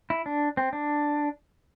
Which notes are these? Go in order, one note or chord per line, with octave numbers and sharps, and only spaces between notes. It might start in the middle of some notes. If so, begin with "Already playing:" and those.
E4
D4
C4
D4